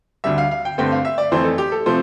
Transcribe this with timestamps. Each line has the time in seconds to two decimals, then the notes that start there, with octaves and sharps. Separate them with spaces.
0.24 D2 D3 G3 E5
0.38 F5
0.51 F5
0.65 G5
0.78 G2 D3 A3 C4 G5
0.92 F5
1.05 E5
1.18 D5
1.32 F2 E3 A3 C5
1.45 A4
1.58 G4
1.72 A4
1.86 C3 F3 A3 C5